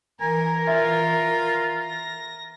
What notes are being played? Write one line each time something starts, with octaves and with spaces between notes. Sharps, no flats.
E3 A#4 G#5 A#5
F4 E5
A#6